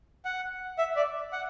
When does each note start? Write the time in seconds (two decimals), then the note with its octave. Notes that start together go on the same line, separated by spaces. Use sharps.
0.25 F#5
0.78 E5
0.96 D5
1.33 F#5